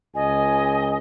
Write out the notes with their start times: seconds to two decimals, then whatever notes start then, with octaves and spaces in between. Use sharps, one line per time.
0.15 C#2 D#5 G#5